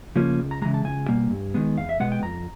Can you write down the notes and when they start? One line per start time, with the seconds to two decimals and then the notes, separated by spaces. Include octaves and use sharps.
0.16 C#3 F3 A#3 C#4
0.39 C#2
0.51 A#5
0.62 C#3 E3 G#3 A#5
0.74 A5
0.85 C#2 G#5
1.09 B2 G3 A#3
1.31 G2
1.54 D#3 G#3 B3
1.77 E2 F5
1.89 E5
2.00 B2 G#3 B3 F#5
2.12 G5
2.23 F2 A#5